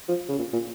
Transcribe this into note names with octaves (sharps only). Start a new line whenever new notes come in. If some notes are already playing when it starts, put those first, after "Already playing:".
F3
C#3
A#2
A#2